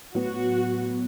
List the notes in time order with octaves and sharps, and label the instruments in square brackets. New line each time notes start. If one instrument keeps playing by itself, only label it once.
[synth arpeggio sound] A2 F#3 B3 [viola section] F#4